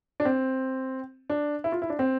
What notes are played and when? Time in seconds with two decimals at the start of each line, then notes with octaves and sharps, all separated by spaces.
0.20 D4
0.25 C4
1.30 D4
1.64 E4
1.72 F4
1.82 E4
1.90 D4
1.99 C4